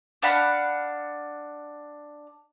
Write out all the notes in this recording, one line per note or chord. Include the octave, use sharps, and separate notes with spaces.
D4 F5 F#5 B5